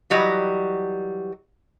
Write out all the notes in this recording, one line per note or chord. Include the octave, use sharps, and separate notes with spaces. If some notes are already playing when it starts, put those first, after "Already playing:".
E3 F#3 G3 D#5